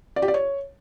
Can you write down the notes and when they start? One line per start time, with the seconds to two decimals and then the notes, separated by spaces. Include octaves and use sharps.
0.16 D5
0.22 G4
0.28 D5
0.34 C#5